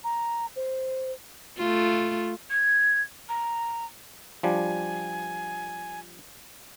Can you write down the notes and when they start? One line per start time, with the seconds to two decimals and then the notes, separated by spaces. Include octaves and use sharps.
0.04 A#5
0.56 C5
1.58 A3 F4
2.50 G#6
3.29 A#5
4.43 F3 G3 D4 G#5